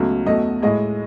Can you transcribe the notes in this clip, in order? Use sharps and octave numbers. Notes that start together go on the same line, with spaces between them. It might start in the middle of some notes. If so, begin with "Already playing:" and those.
Already playing: C#2 B2 F#3 A3
E2 B2 F#3 A3 D#5
A2 G#3 D#5